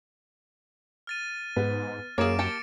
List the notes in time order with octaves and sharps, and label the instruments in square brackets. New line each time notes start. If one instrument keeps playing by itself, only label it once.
[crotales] F6 A6 D#7
[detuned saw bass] G#2 [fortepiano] B3
[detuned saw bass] F#2 [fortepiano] A#3 [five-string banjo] G#4 C#5 [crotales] D6 D7 E7
[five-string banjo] G4 G5 A5 [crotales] A6 C#7